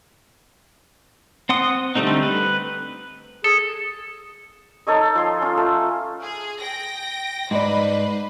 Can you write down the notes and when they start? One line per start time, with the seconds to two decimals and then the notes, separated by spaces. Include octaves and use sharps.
1.49 C4 F#5 C6 D#6
1.95 D3 G3 A3 C4 D#4
2.23 B4
3.44 G#4 A4
4.87 D#4 A4 C#5 D#5
5.15 F3 C6
5.42 C#4 F4
5.57 A3
6.22 G#4
6.59 G5 A#6
7.51 G#2 D#4 B4 C5 D5